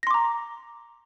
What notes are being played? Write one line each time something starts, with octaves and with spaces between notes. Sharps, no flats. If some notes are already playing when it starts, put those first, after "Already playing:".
A#5 C6 D6 A#6